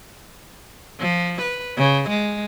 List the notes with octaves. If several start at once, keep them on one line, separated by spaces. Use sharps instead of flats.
F3
B4
C#3
G#3